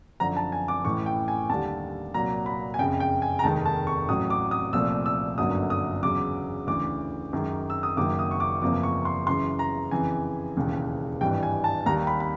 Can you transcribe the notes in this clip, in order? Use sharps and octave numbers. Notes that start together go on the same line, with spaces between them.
F#2 D3 F3 A#5
A5
G#5
D6
A1 A2 E3 C#6
G5
G#5
D#2 D3 G3 A5
C2 A#2 F#3 A#3 A#5
B5
G#5
F#1 F2 C#3 G5
G5
G#5
A#5
F1 D#2 D#3 G#3 A5
A5
C#6
A1 A2 F#3 D#6
D6
D#6
C2 A#2 F3 A3 E6
E6
G1 F#2 D3 F#3 A#3 D#6
D#6
E2 C#3 F#3 D6
D2 C#3 E3 D6
F#2 D#3 G#3
E6
D#6
F#1 F#2 D#3 F#3 A#3 D6
D#6
C#6
D6
F#1 E2 C3 F3 A#3 D6
C#6
C6
F#2 C#3 E3 C6
A#5
F2 C#3 E3 G#5
E1 D#2 C#3 E3
G#1 G2 E3 G3 G5
G#5
A5
D#2 D#3 G3 A#5
B5
B5